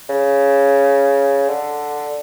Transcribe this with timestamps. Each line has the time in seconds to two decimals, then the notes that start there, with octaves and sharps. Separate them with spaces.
0.09 C#3
1.49 D3